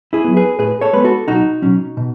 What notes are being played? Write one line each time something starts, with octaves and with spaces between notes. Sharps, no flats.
E4 G#4
F#3 B3
G#4 B4
A2 G#4 B4
A4 C#5
G#3 B3 B4
F#4 A4
B1 D#4 F#4
B2 F#3 C#4
B2